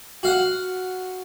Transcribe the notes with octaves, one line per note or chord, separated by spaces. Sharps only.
F#4 F5 F#5